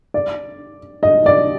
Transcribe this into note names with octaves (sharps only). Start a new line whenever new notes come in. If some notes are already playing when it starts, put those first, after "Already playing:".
D5
D#5
D5